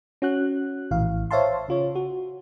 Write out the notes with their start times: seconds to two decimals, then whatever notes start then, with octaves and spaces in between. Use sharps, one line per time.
0.22 C#4 F#4 F#6
0.91 A#1 A2 E3 F5
1.31 C5 C#5 E5 F5 A5 C6
1.68 C#3 F4 C#5
1.95 F#4